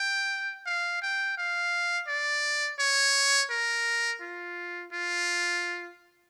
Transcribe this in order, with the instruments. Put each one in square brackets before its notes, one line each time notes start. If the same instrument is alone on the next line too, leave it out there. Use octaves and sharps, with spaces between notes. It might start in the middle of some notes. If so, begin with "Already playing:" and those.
Already playing: [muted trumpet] G5
F5
G5
F5
D5
C#5
A#4
F4
F4